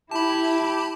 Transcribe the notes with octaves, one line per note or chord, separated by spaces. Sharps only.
E4 G4 A5 B5